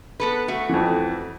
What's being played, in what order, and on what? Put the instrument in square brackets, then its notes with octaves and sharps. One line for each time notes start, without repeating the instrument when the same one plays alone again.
[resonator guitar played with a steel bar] B3 A4 B4
A3 F#4
[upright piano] F2 E3